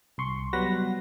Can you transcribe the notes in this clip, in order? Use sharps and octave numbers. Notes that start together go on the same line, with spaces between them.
C2 C6 C#6
F#3 G3 B3 F#5 B5 A#6